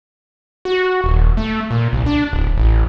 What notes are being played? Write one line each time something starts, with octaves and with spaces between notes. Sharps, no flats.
F#4
D#1
A3
A#2
C2
D4
D1
A1